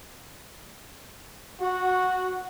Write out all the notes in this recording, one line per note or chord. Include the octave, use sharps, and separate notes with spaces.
F#4